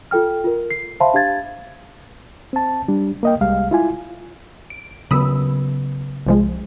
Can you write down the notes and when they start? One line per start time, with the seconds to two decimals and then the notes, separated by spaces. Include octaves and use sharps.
0.11 F4 A4 G5 F6
0.44 F4 A#4
0.71 C7
1.00 C5 E5 F5 A5 B5 C6
1.14 D4 G4 F5 G#6 A6
2.53 C4 A5
2.88 G3 D4
3.23 A#3 D#5 G5
3.41 C2 G3 G#3 F5
3.71 E4 F4 G#5
4.70 D7
5.11 C#3 F#3 B3 B5 D#6 E6
6.27 C2 F3 G#3